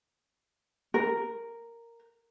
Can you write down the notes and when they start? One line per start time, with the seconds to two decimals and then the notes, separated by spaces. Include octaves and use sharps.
0.94 A#4